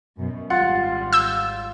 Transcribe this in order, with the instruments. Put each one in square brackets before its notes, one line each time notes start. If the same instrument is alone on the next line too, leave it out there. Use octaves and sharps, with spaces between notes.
[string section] F#2 B2
[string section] G#1 G3 [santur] F4 [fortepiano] F#5
[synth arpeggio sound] E6 G6